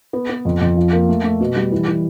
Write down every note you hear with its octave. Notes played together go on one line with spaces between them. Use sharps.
B3
B3
F2
F2
F3
A#3
A3
A3
B2
G3
E3
E3